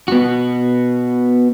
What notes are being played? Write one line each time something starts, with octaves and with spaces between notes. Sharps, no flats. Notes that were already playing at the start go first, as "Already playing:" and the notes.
B3 F#4